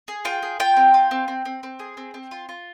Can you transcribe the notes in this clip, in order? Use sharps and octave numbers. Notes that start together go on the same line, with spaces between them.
G#4
F4 G5
G#4
F4 G5
C4
F4
C4
C4
C4
C4
G#4
C4
C4
F4
F4